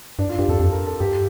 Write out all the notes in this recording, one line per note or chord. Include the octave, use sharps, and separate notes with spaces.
G2 D4
F4
G2 G4
F2 A4
F2 A4
A#4
A4
G2 G4